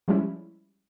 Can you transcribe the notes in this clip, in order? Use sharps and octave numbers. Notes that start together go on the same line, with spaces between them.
F3 G3 G#3 C#4 E4